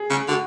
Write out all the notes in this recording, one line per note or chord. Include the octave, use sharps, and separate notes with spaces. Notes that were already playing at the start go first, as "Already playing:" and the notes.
Already playing: G#4
C#3
D3 F#4